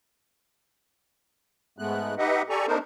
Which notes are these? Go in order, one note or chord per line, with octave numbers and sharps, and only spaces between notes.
G#2 G#3 A3 B3 F#6
D#4 G4 B4 D#5 E5 F#5
G4 A4 D5 G#5 A#5 C#6
A3 B3 D4 D#4 A#4 C5